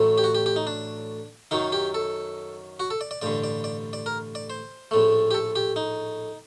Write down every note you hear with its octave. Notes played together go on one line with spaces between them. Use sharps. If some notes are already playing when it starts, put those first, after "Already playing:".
Already playing: A1 A2 F#3 A3
G4
F#4
G4
G4
D#4
D4
F#2 D#3 F#3 D#4
G4
A4
F#4
A4
D5
D5
A1 G2 D3 D5
D5
D5
D5
A#4
D5
C5
A#1 A2 A3
G4
A4
G4
D#4